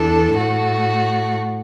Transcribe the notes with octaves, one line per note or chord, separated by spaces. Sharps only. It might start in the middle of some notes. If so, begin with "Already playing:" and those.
Already playing: E2 E3 D4 A4
A2 A3 F#4